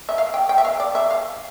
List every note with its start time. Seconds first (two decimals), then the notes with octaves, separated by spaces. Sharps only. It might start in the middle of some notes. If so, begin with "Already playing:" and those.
0.09 E5
0.18 F5
0.34 G5
0.49 G5
0.58 E5
0.65 F5
0.80 D5
0.95 E5
1.11 F5